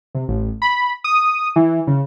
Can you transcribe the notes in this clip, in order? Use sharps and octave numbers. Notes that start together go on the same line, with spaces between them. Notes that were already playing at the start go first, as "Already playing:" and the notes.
C3
A1
B5
D#6
E3
C#3